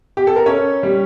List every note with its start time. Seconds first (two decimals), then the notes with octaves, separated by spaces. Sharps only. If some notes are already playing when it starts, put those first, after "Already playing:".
0.17 G4
0.27 A4
0.36 A#4
0.46 C#4 C#5
0.83 G3